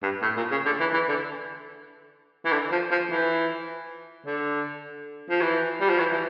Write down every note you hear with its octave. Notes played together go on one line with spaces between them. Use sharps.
G2
A2
A#2
C#3
D3
E3
E3
D3
E3
D3
F3
F3
E3
D3
F3
E3
G3
F3
E3
E3